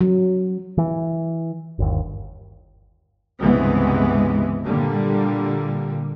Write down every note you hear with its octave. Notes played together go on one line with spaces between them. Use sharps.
F#3
E3
G1 D#2
C#2 G2 C3 E3 G#3 B3
A#2 D3 G3 A#3